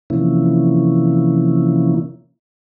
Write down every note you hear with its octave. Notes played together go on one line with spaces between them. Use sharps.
C3 E3 F3 A#3 C#4 E4